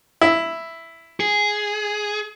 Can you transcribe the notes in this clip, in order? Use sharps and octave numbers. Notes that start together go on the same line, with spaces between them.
E4
G#4